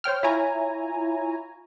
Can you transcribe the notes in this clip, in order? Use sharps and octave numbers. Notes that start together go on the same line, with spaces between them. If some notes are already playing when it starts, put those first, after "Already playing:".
C5 C#5 G5 F6
E4 F4 C#5 G#5 A#5